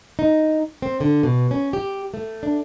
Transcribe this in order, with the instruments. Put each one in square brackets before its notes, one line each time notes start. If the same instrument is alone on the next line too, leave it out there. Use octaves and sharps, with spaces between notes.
[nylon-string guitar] D#4
C4
D3
B2
C#4
G4
A3
D4